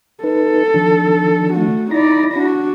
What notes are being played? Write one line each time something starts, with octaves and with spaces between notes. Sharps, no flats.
D#4 A4 B4
D#3 F3 D4
A3 F#4
D#4 E4 D5 B5 A#6
D4 F#4